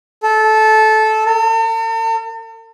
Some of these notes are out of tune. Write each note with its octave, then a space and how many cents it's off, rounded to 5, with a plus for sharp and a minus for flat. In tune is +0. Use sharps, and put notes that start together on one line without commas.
A4 -15
A4 +45